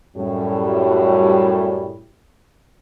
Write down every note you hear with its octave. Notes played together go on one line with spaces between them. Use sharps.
F#2 A2 G3